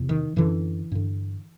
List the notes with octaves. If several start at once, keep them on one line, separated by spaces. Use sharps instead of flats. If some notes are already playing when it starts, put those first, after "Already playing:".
Already playing: E2 C3
D#3
F#2 D3 E3
G2 D3